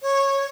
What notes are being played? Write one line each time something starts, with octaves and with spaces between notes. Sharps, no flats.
C#5